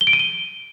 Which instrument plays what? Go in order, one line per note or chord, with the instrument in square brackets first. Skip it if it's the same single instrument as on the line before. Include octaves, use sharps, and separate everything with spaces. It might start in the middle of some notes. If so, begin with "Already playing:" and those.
[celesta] G7
D7
D#7
G7